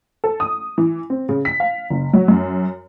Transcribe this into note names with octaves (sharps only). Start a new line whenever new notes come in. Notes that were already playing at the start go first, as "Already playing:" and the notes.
A4
D#6
E3
C4
C#3
B6
F5
F#1
F#3
F#2